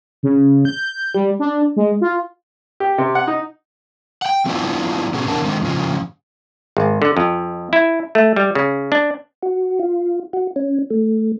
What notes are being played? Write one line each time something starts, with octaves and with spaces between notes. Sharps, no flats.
C#3
G6
G3
D4
G#3
F4
G4
C3
F#5
D#4
F#5 G5
F#3 B3 C4 D4 E4 F4
B2 B3 C#4 G#4
E2 C3 D4 A#4 F#5 A5
D3 D#3 G#3 C4
F2 A#2 C#3 F3
G#1
D3
F2
E4
A3
G3
C#3
D4
F#4
F4
F#4
C#4
A3